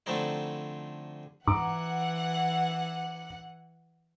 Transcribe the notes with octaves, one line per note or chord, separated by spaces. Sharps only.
D3 F3 A3 C4 D#4 E4
G#2 E3 F#5 A#5 D6